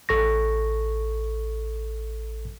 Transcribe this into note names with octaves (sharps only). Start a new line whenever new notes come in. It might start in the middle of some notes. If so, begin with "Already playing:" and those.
A1 A4 C#6 A#6